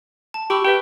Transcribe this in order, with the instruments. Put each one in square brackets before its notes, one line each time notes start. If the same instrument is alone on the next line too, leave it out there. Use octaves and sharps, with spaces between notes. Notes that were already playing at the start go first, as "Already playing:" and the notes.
[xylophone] A5
[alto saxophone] G4 [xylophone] B5 C#6 E6
[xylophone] G4 B4 E5 [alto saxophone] G5